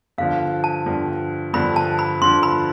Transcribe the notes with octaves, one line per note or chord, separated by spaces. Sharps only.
G2 D3 F3 F5
A5
G2 D3 F3
G2 D3 F3 B5
A5
B5
G2 D3 F3 C6
B5